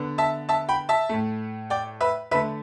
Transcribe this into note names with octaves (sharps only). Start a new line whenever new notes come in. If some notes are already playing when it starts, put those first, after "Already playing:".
Already playing: D3 B3
E5 A5
E5 A5
G5 B5
E5 A5
A2 A3
D5 G5
B4 E5
D3 A3 B4 E5